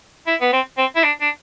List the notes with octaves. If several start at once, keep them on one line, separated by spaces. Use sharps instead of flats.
E4
B3
C4
C4
E4
D4
D4